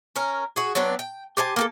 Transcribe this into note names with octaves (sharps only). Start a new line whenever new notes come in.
C#4 A#4
F#4 G#4
F#3 B3 C4 D4
G5
G4 C5 G#5 A5
A#3 F#4 A4